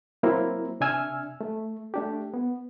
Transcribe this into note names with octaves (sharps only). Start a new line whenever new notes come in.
F#3 A#3 C4 E4 A#4 C5
C3 D4 E5 G#5 E6 F6
A3
A3 D4 G4
B3